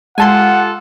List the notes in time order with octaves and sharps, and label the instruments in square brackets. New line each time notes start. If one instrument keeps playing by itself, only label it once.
[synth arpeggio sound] G#3 [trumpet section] F4 G4 A4 [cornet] F#5 [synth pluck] G#5 A5 C6